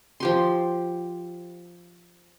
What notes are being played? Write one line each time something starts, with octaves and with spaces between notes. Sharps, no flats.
F3 G4 C6